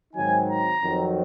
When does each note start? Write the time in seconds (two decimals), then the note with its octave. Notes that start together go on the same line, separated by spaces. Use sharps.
0.13 G#2 D#3 F#3 C4 D#4 G#5
0.47 A#5
0.81 F2 D#3 F#3 C4